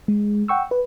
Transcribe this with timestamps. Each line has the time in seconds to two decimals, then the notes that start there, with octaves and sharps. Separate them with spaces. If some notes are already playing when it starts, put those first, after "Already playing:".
0.08 G#3
0.48 F#5 G5 C#6 E6
0.71 B4